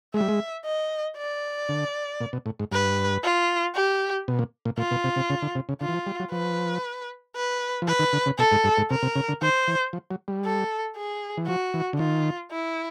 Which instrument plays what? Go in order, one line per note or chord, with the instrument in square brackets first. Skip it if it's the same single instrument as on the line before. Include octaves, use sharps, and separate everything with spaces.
[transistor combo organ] G#3 [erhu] E5
[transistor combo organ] G3
G#3
[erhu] D#5
D5
[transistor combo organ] D3
A#2
B2
A2
G#2
[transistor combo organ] G2 [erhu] B4
[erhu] F4
G4
[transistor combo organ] B2
A#2
A#2
[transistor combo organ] A#2 [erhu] F4
[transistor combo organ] B2
C3
C3
C#3
D3
C3
C#3
[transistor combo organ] D3 [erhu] F4
[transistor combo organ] E3
F3
G3
F#3
[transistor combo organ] F3 [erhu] B4
[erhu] B4
[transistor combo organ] F3
[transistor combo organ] E3 [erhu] B4
[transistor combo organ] D#3
D3
C#3
[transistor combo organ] B2 [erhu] A4
[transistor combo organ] G#2
G2
G#2
[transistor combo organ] C3 [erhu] A#4
[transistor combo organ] C3
C#3
D3
[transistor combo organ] D#3 [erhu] C5
[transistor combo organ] E3
F3
F#3
G3
[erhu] A4
G#4
[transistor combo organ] E3
[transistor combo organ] F3 [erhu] F#4
[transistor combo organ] E3
D3
[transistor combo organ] D#3 [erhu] F4
[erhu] E4